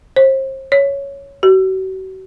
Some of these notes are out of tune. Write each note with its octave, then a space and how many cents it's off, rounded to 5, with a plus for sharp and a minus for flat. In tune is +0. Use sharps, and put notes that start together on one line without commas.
C5 +35
C#5 +5
F#4 +40